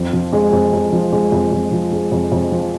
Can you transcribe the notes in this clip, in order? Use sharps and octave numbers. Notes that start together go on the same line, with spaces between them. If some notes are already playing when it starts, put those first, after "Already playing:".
Already playing: F2
F3
G#3
F2
F2
F3
G#3
F2
F2
F3
G#3
F2
F2
F3